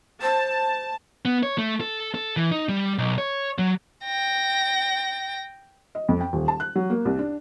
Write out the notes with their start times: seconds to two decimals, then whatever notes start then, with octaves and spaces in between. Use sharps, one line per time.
0.22 C5 A5
1.25 B3
1.43 C#5
1.58 A3
1.81 A4
2.14 A4
2.37 E3
2.51 D#4
2.69 G3
2.98 B1
3.18 C#5
3.59 F#3
4.04 G5 A#6
5.95 D#5
6.09 F2
6.20 G5
6.33 D#1
6.48 A5
6.60 F#6
6.75 F#3
6.90 A#3
7.05 C2
7.19 D4